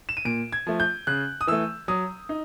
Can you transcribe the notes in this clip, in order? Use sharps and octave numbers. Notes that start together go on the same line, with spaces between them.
E7
D#7
A#2 D7
G#6
F3 A3
G6
C#3 F#6
D#6
E3 A3 E6
F#3 D#6
D#4